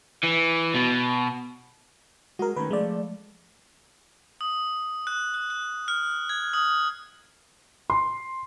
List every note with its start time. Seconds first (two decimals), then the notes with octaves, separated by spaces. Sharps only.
0.24 E3
0.75 B2
2.39 G#3 F#4 A#4
2.56 D#3 A3 C#4 B4
2.70 F3 G#3 A3 D5
4.41 D#6
5.07 F#6
5.34 F#6
5.50 F#6
5.88 F6
6.29 G#6
6.53 D#6
7.90 C6